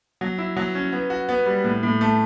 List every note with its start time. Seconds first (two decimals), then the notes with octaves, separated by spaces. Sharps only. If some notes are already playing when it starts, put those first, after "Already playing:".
0.21 F#3
0.38 E4
0.56 F#3
0.75 C#4
0.92 B3
1.10 F#4
1.29 B3
1.46 G3
1.64 A2
1.83 A2
2.01 A3